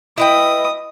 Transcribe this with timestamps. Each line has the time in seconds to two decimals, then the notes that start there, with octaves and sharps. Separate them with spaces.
0.18 E4 B4 D#5 G5 D#6